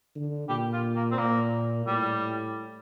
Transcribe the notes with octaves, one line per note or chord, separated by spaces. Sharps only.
D3
A#2 G4
F4
A#3
C4
A#2 A#3
A2 G3